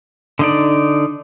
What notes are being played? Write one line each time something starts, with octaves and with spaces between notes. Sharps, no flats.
D3 D#4 D5